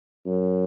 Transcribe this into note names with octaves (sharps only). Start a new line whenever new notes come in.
F#2